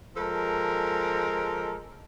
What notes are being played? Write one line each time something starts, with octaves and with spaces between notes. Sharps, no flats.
F3 G#3 A4 A#4